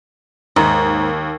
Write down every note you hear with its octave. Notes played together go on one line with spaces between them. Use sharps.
D#2 G#2